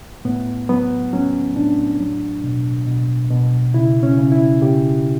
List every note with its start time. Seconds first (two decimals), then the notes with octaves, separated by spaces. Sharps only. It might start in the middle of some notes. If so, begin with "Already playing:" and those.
0.25 A2 B3
0.69 F#3 B3
1.13 F#3 C#4
1.56 A2 D4
2.00 F#3
2.44 B2
2.86 B2
3.30 B2
3.74 C#3 E4
4.03 C#4
4.17 C#3
4.32 E4
4.61 C#3 G4